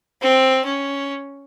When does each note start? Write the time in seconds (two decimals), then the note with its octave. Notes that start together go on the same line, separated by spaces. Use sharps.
0.22 C4
0.65 C#4